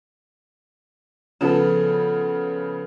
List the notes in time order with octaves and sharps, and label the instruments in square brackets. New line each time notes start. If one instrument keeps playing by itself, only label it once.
[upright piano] C#3 F3 B3 [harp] A4 E7